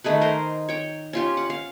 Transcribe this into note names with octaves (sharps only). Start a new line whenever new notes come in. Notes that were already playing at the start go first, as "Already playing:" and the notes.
D#3 A3 G#4 B4
A#4 C5 D#5
C#5 G5
C#4 F4 G4
F#5
F5